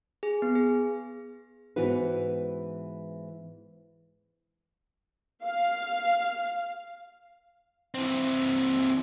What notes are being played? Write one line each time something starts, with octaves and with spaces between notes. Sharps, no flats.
G#4
B3
G#4
G#2 E3 B3 E4 F#4 B4
F5
E3 C4